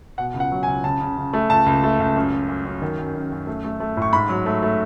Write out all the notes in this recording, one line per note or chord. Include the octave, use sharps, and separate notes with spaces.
B2 F#5
C#2
F#5
F#3
G#5
C#2
C#3 A5
C#3
C#3
A3
C#2 A5
C#2
A3
C#2
F#2
F#2
F#2
F#2
D#3
F#2
F#2
F#2
A3
A3
A3
A2 C#6
G#2 B5
F#3
A3
A3